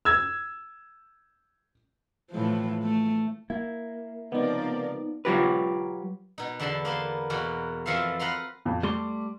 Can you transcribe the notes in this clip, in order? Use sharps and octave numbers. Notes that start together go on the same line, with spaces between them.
E6 G#6
A2 E3 F3
A3
A#3 E4
C#2 C3 F3 B3 D#4 A#4 D5
F#3 F4 G4 B4
B2 D#4
E2 D3 E5 A5 B5 C6
A#3 B3 A5 C6
E2 B2 A#3 F#4
F2 E3 F3 F4 A4 F5
B4 F5 F#5 A#5 C6
F2 F3
G3 A3 C6 D6